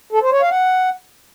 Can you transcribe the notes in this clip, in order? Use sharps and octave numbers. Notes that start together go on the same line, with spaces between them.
A4
C5
C#5
F5
F#5